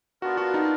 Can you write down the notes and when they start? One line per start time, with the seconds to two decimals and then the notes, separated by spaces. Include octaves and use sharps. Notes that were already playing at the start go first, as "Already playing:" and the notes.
0.22 B3 D4 F4 F#4 A#4
0.37 F#4
0.54 D#4